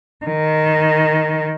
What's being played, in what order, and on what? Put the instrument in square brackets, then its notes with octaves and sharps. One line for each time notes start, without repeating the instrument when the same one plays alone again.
[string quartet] D#3